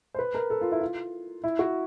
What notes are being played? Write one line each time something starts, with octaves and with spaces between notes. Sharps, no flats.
C5
B4
A#4
A4
F4
E4
F4
E4
F#4